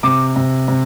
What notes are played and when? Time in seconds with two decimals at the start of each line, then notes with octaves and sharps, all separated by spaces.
0.03 C3 D6
0.36 C3
0.68 C3